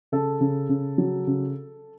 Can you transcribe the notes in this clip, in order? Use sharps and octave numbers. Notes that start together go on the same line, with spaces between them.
C#3 A4
C#3
C#3
F#3
C#3